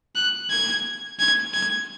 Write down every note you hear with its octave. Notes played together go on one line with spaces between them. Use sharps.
F#6
G#6
G#6
G#6